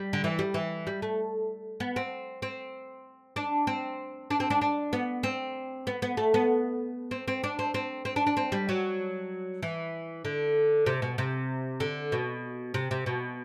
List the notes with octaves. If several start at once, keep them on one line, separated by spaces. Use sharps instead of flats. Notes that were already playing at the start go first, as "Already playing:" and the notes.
Already playing: G3
D3
E3
G3
E3
G3
A3
B3
C4
C4
D4
C4
D4
C4
D4
D4
B3
C4
B3
B3
A3
B3
C4
C4
D4
C4
C4
C4
D4
D4
C4
G3
F#3
E3
D3
C3
B2
C3
D3
B2
C3
C3
B2